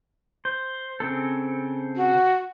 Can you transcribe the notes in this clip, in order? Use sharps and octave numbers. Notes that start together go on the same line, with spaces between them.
C5
C#3 C4 A4
F#4